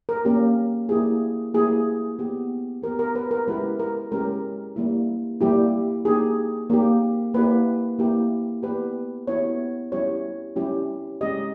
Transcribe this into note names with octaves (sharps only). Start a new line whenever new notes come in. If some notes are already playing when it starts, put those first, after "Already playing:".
A#4
A#3 C#4 G4
A#3 E4 G4 G#4
A#3 E4 G4 G#4
B3 G4
B3 G4 A#4
A#4
B4
A#4
G#3 C#4 E4 G4 B4
A#4
G#3 C#4 E4 G4 A#4
G3 A#3 E4
G3 A#3 E4 G4
A#3 D#4 G4 G#4
A#3 D#4 G4
A#3 E4 G4 B4
A#3 E4 G4
B3 E4 G4 B4
B3 E4 G4 C#5
G3 C#4 E4 G4 C#5
G3 C#4 E4 G4
G#3 C#4 G4 D#5